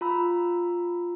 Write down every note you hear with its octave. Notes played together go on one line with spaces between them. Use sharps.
F4 A#5 B5 E6